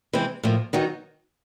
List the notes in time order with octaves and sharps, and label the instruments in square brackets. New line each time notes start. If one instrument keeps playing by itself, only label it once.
[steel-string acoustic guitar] C3 E3 G#3 C4
A2 F3 A#3
D#3 F#3 B3 D#4